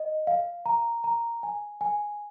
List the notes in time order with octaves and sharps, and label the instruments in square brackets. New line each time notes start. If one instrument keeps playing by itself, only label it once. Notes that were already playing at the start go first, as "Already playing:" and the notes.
Already playing: [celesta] D#5
F5
A#5
A#5
G#5
G#5